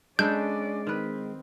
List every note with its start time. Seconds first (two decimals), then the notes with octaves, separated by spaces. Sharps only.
0.19 G#3 C#4 D4 A4 B4 D5 G6
0.87 D#3 C4 B4